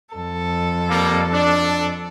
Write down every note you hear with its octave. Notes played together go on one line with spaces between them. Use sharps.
F2 A4
G3 A#3
D4